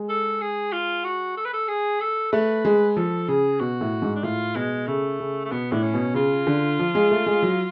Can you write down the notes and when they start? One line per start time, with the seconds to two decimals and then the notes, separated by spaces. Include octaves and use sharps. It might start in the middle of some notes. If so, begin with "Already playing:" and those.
Already playing: G#3
0.09 A4
0.41 G#4
0.72 F4
1.04 F#4
1.37 A4
1.45 B4
1.53 A4
1.68 G#4
2.00 A4
2.32 A3 B4
2.65 G#3
2.96 F3 A4
3.28 C#3 G#4
3.60 B2 F#4
3.81 A2
4.02 G#2
4.15 D4
4.23 A2 F4
4.55 B2 G#3
4.87 C#3 A3
5.20 C#3
5.45 A3
5.51 B2 B3
5.72 A2 D4
5.83 C#4
5.94 B2
6.14 C#3 F4
6.47 D3
6.79 F3
6.95 G#3
7.11 A3
7.26 G#3
7.43 F#3